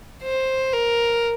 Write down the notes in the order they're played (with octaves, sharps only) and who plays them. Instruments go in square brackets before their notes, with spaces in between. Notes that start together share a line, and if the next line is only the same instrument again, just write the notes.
[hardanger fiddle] C5
A#4